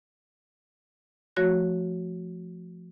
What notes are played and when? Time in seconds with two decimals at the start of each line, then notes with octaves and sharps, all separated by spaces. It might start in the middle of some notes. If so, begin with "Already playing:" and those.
1.36 F3 A3 F#4 C#5 F#6 A#6